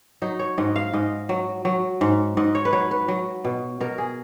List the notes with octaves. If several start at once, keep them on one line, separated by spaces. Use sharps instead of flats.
F#3 D#4
C#5
G#2 D#5
F5
G#2 D#5
F#3
F#3
G#2
G#2 D#5
C#5
B4
F#3 C#5
B4
F#3
B2
B2 A#4
G#4